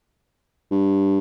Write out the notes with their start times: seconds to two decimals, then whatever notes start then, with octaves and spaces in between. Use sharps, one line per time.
0.71 G2